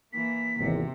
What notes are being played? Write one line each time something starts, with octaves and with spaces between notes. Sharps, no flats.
E3 A#3 B6
G#1 E2 C3